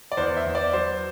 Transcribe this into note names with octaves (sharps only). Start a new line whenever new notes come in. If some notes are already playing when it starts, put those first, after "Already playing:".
D5
E2 C5
E5
E2
D5
F#3 C5